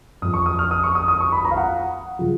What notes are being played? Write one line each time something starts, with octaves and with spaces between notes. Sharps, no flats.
F2 F3 D#6
C#6
D#6
F6
D#6
C#6
D#6
D#6
C#6
B5
A#5
F5
F#5
C#3 F3